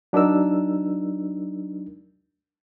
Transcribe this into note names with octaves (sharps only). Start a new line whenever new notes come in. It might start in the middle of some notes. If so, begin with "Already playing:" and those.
F#3 D4 D#4 A#4 E6